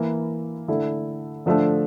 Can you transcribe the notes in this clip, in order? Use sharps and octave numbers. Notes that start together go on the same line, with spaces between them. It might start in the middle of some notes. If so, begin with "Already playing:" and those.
Already playing: E3 A#3 E4 A#4
D3 A3 E4 A4
D3 F3 A3 D4 A4